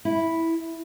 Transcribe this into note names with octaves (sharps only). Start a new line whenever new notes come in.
E4